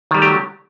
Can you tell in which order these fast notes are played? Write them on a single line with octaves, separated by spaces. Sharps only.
D#3 G3 A3 G4 F#3